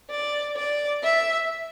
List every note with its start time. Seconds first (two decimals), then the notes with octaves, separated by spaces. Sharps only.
0.10 D5
0.56 D5
1.03 E5